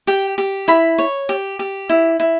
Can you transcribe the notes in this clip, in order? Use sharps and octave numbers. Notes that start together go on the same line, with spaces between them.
G4 G5
G4
E4 B5
C#5
G4
G4
E4
E4